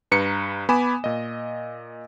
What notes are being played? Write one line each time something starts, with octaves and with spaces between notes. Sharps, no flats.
G2 B4 A#5 C#7
B3 G#5 B5 D6 E7
A#2 D#5